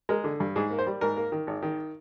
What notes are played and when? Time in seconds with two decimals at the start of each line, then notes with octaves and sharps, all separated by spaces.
0.09 G#3 A#4
0.24 D3
0.40 G2
0.56 G#2 G#4
0.71 A#3
0.78 C5
0.86 G3
1.01 G#2 A#4
1.17 A#3
1.32 D#3
1.47 G#1
1.62 D#3